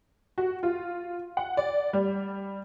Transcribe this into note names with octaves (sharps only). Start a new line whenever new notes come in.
F#4
F4
F#5
D5
G3